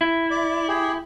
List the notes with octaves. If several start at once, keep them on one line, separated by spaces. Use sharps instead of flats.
E4
D5
G4 G#4